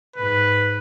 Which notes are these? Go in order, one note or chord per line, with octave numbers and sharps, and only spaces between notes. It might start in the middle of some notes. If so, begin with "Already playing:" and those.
G#2 B4